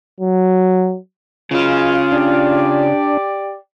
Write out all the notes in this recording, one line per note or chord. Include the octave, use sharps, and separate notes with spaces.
F#3
C#3 F#3 G#3 C#4 F4 B4
D4 G4 D5